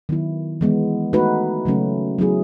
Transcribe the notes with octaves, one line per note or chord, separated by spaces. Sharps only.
D#3 F#3 B3 E4
E3 G#3 B3
A3 D#4 F#4 B4
C#3 F#3 A3 C#4
F#3 B3 E4 G#4